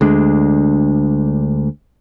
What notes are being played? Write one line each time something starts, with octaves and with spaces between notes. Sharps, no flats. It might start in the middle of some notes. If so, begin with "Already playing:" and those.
D2 G#3 D4